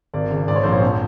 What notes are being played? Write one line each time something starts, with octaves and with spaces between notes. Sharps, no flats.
G#1 D5
C#3
G#2 D5
C#5
A#1 C5
C#5
F2